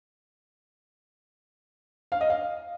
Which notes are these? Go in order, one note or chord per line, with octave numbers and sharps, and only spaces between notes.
F5
D#5
F5